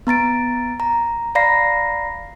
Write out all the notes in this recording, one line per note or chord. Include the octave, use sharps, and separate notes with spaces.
B3 A#5 A6 D7
A#5
D5 F5 A#5 B5 A#6 C7